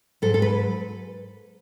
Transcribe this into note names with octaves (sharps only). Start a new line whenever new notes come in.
G#2 F#3 A4
A4
B4